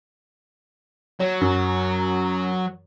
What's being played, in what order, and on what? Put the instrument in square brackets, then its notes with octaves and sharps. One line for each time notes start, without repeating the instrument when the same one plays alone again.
[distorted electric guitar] F#3 [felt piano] C#5
[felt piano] F#2